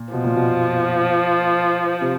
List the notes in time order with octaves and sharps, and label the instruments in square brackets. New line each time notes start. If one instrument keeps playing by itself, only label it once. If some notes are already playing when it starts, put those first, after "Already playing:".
Already playing: [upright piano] A#2
[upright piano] B2 [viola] F3
[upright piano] A#2
B2
C3